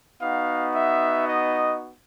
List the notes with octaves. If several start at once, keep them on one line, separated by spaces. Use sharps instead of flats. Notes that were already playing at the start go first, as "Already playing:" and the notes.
B3 D#4 F#4 F5
E5
D#5